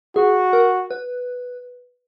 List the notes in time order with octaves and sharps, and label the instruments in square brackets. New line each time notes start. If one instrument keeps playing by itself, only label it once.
[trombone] F#4 [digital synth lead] G#4
[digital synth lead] A#4
B4